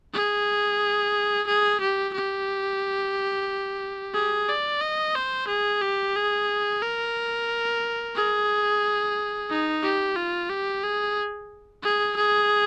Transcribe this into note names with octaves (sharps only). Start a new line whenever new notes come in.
G#4
G#4
G4
G4
G#4
D5
D#5
C5
G#4
G4
G#4
A#4
G#4
D#4
G4
F4
G4
G#4
G#4
G#4